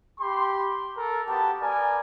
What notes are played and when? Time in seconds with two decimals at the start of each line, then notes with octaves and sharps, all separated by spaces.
0.20 G4 B5 C6
0.97 A4 A#4
1.28 B3 F#4 G4 A5
1.61 B3 A#4 D5 G#5